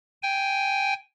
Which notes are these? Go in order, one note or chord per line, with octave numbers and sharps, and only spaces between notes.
G5 G#5